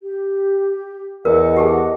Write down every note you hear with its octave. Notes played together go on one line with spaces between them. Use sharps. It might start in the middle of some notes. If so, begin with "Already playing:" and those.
G4
E2 A#4 D#5 F#5
G4 G#4 A5